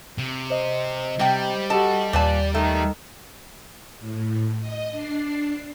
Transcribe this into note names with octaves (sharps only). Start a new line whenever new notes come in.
C3
C5 D#5
C3 G3 G4 G5
F#4 G4 A4 D#5 A5
D#2 A#2 B4 D5 A5
D#3 A3
A2
D#5
D4 C7